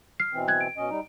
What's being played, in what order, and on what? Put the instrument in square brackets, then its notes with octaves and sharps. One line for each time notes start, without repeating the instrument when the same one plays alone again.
[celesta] F6 C7
[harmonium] B2 E3 C4
[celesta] F#6 G#6
D7
[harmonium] B2 C#4 D#5
G3 D#4